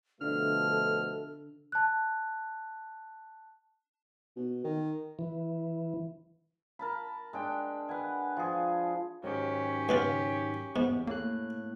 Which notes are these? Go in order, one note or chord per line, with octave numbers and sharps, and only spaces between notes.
B2 D3 F3 A3 A4 F6
A5 F#6
B2
D#3
E3
A#4 A5 B5
G#3 D4 G5
B4 F#5 G#5
F3 G#4
G#2 D#3 F#3 C#4 G4
C#2 B3 F4
E2 G#2 B3
A2 A#3 F#6